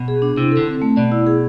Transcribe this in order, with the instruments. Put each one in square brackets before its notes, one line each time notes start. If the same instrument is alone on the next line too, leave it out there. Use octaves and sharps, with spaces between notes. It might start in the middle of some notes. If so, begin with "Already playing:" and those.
Already playing: [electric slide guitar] B2
[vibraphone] G#4
D4
[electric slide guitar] C3 [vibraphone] E4
[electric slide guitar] D3 [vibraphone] A4
[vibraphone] C4
A3
[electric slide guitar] B2 [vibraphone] D5
[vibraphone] E4
G#4